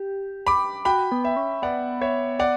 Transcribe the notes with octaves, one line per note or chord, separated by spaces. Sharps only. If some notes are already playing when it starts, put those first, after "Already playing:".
Already playing: G4
B5 D6
F#4 G5 B5
B3
E5 G5
C#4
B3 D5 F#5
C#5 E5
D5 F#5